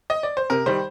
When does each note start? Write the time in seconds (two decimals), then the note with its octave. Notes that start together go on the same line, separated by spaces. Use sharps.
0.10 D#5
0.23 D5
0.37 C5
0.50 C3 A#4
0.66 D#3 G3 C5